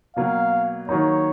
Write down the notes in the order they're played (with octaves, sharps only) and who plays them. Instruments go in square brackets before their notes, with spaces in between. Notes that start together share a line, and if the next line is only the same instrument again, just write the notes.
[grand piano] B2 F#3 A#3 [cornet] F5
[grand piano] D#3 F#3 A#3 D#4 [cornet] C#5